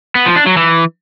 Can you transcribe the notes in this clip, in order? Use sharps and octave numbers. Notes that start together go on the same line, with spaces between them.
B3
F3
D4
F#3
E3